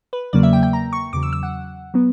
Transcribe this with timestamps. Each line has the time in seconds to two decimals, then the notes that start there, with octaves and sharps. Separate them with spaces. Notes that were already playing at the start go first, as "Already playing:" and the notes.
0.13 B4
0.33 E2 C#3 F#3 A#3 D5
0.43 E5
0.53 G5
0.63 G5
0.73 A#5
0.93 C#6
1.13 E2 C#3 F#3 D6
1.23 E6
1.33 E6
1.43 F#5
1.94 F#3 B3